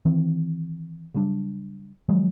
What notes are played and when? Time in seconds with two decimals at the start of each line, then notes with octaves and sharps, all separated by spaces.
0.05 D#3 E3 C4
1.14 C#3 F#3 G3 D4
2.09 D#3 F3 F#3 G#3